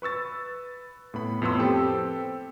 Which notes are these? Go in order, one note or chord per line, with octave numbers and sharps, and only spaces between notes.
B4 C#6 E6 A6
A2 B3 B5
F2 A2 B3 C6 E6
C4 G4 A4 B4 C5